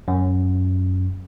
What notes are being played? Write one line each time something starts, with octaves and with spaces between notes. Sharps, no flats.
F#2